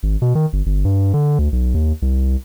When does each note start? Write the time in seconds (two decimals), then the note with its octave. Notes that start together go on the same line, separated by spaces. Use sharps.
0.03 G#1
0.22 B2
0.35 D#3
0.53 G1
0.66 G1
0.85 G2
1.14 D3
1.39 D2
1.52 B1
1.74 D#2
2.02 C2